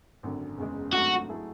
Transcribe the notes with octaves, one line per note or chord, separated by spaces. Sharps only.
G#1 F#2 D3
F#1 E2 C#3 G#3
G#1 G#2 F#3 A3 D4 F#4
F#3 A3 E4 G#4